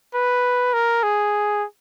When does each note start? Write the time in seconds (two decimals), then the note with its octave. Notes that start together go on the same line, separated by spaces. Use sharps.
0.15 B4
0.73 A#4
1.03 G#4